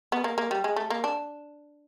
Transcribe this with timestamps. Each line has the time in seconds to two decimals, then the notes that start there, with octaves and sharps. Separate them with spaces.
0.12 B3
0.24 A#3
0.38 A#3
0.51 G3
0.64 G#3
0.76 A3
0.90 A#3
1.04 D4